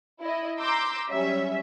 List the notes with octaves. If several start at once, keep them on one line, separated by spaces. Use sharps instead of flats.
E4 D#5
A#5 C6 D6 E6 G6
F#3 G3 C#4 E5